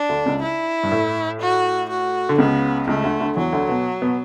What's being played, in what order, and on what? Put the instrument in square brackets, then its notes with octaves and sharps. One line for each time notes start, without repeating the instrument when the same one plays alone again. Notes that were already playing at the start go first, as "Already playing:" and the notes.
Already playing: [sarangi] D4
[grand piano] D2 D3
C#2 C#3
[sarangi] E4
[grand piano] G2
A2
[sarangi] F#4
F#4
[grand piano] D3
[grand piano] C#2 C#3 [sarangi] B3
[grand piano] C#2 C#3 [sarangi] A3
[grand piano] D2 D3
D2 D3
[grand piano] E2 E3 [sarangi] F#3
[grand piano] D2 D3
B2 B3
B2 B3